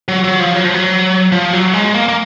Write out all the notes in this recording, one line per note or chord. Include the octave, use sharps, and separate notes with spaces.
F#3
F#3
F3
F#3
F3
F#3
F3
F#3
G#3
A#3
A#3